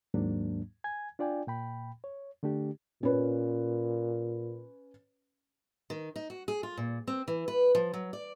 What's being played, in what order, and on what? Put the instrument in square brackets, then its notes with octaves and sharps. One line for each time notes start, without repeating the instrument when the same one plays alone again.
[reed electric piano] D#2 G#2 F#3 A#3 D4
G#5 G#6
D4 F4 D5 G5 G#5
A#2 G5 B5
C#5
D3 A3 D4 G4
[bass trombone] A#2 [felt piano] C#4 B4
[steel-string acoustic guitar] D#3
D#4
F#4
G#4
F4
A#2
C4
E3
B4
F3
F#3
D5